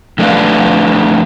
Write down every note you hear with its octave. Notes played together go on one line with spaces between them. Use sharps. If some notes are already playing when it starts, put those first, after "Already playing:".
F2 A3 B3 D4 B4 F5